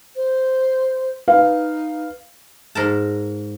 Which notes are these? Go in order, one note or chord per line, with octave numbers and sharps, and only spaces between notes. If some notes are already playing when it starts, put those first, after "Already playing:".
C5
D#4 B4 F5
G#2 A#4 A5